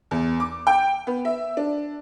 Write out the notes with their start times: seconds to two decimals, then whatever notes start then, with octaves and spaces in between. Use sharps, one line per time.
0.11 E2
0.40 D6
0.67 G5
1.07 B3
1.25 E5
1.57 D4